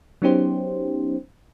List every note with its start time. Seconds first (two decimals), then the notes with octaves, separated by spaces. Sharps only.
0.22 F#3 B3 C#4 D#4 G4 C5